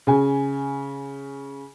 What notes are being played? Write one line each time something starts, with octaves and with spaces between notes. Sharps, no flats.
C#3 G#5